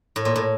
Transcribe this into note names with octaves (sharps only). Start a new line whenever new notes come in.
A2
A#2
A2